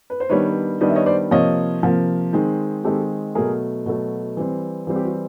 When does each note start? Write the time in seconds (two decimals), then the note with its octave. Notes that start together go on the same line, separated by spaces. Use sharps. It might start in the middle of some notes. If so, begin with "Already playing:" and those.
0.10 B4
0.20 C5
0.29 D#3 G3 B3 D4 B4 C#5
0.81 D#3 G3 B3 D4 D#5
0.89 E5
0.95 C#5 D#5
1.06 C5 D5
1.31 C3 F3 A#3 C#5 D#5
1.83 C3 F3 A#3
2.33 D#3 G#3 C4
2.84 D#3 G#3 C4 G4 A4
3.35 B2 F#3 A3 G#4 A#4
3.86 B2 F#3 A3 F#4
4.37 E3 G3 C4
4.87 E3 G3 C4 F4
4.96 G4
5.05 F#4